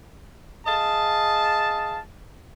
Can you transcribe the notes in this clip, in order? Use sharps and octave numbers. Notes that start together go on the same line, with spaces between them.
G#4 D#5 F5 A5